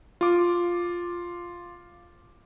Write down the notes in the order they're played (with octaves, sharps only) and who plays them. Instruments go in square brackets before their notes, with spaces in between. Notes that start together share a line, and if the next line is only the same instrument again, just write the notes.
[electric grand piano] F4 D6